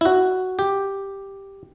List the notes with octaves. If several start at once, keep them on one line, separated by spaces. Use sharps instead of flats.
E4
F#4
G4